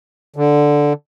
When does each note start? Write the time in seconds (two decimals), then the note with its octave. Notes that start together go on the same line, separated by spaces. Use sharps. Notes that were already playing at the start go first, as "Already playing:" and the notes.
0.36 D3